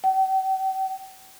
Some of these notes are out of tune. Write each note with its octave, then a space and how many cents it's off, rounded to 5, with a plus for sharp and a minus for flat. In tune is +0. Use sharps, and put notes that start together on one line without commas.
G5 -45